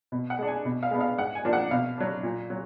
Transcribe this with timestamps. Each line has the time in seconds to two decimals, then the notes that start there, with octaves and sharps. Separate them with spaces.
0.12 B2
0.30 F#5
0.39 G#3 D4
0.48 G#5
0.65 B2
0.83 F5
0.91 G#3 B3 D4
1.01 F5
1.18 G#2 F#5
1.35 G#5
1.45 F3 A#3 D4
1.53 F#5
1.71 B2 F5
1.98 F#3 D4
2.23 A#2
2.50 F#3